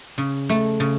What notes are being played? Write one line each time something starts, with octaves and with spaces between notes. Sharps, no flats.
C#3
A3
C#3